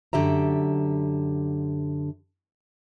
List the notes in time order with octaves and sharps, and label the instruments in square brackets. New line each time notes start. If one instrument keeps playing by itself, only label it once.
[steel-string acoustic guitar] F#2 D3 G4 E5 A#5